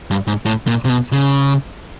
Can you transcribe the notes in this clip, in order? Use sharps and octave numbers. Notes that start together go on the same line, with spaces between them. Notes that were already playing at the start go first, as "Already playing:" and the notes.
G2
G#2
A2
A#2
C3
B2
C#3